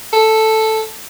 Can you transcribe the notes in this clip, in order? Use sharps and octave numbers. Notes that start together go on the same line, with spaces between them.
A4